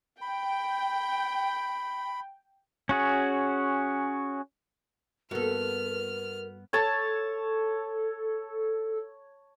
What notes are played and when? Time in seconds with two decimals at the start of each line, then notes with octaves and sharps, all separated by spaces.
0.21 G5 B5
2.89 C#4 F#4 G#4
5.31 G2 A#3 B3 F#4 A4 A#4 F6
6.73 A4 C#5 A5